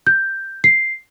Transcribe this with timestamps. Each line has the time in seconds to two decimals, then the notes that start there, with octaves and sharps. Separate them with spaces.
0.07 G6
0.64 C7